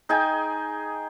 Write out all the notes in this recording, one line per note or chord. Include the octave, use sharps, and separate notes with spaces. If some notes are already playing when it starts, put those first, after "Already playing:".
D#4 G#4 G5 G#5